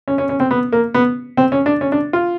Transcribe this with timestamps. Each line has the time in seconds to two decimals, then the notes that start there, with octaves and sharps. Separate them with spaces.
0.08 C#4
0.18 C#4
0.29 C#4
0.40 C4
0.51 B3
0.72 A#3
0.94 B3
1.37 C4
1.52 C#4
1.66 D4
1.81 C#4
1.92 D4
2.13 F4